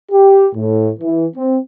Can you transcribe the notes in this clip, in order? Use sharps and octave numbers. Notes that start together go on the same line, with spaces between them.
G4
A2
E3
C4